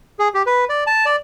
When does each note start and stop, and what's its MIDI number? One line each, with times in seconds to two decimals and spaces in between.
0.19 0.28 68
0.34 0.43 67
0.46 0.65 71
0.69 0.84 74
0.87 1.06 81
1.06 1.16 74